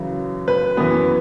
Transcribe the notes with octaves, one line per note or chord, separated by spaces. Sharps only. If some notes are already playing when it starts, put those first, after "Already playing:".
Already playing: F#2 C#3 E3
B4
F#2 E3 B3